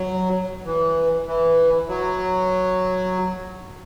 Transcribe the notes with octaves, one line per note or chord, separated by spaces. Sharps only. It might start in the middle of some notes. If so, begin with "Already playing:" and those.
Already playing: F#3
E3
E3
F#3